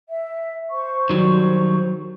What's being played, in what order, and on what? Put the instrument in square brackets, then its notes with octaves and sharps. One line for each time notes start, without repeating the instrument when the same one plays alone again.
[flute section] E5
C5 C#6
[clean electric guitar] D#3 F#3 G3